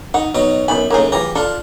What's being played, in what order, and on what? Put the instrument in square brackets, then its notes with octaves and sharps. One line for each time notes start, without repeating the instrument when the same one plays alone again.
[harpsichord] D#4 [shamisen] F#5
[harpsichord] B2 F#3 D#4
[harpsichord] F#2 B5 [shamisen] B3 D#4 G#5
[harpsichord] F#2 A2 C#3 [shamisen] A#3 D#4 G#4
[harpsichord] E3 G4 A#5 [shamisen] F4 G#4
[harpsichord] D4 F4 [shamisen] A4